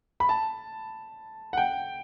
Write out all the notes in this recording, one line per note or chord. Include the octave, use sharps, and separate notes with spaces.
B5
A5
F#5
G5